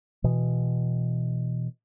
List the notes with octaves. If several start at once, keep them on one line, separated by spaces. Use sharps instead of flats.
B2 E3